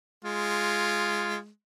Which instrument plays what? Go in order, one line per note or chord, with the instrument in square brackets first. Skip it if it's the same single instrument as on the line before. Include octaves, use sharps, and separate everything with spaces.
[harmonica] G#3 [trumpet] F4